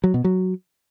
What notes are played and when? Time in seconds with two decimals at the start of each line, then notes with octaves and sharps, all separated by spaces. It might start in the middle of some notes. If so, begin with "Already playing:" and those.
0.04 F#3
0.14 B2
0.24 F#3